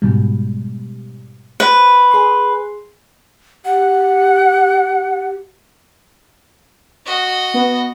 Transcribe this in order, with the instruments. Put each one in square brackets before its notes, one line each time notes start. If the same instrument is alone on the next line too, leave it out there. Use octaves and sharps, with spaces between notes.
[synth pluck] G#2 B2 G3
[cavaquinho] B4 [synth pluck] C5
[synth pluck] G#4 C6
[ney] G4 [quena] F#5
[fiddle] F#4 D#5
[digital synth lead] B3